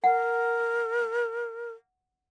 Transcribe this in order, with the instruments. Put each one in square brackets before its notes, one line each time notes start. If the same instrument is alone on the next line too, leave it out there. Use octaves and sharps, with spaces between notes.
[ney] A#4 [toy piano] F#5